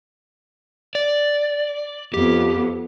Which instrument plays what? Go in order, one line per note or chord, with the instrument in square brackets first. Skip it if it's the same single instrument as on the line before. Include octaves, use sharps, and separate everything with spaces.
[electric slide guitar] D5
[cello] F2 B3 [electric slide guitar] G4